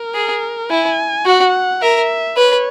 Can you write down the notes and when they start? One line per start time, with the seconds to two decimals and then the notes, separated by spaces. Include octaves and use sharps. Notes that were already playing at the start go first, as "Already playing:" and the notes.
Already playing: A#4
0.14 G#4
0.70 E4 G#5
1.26 F#4 F#5
1.82 A#4 E5
2.37 B4 C#5